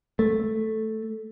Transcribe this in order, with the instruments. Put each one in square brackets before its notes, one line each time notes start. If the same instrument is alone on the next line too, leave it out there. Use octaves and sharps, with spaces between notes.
[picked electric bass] A3